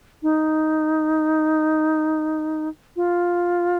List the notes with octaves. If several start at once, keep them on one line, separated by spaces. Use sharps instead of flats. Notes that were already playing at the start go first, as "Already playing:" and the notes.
D#4
F4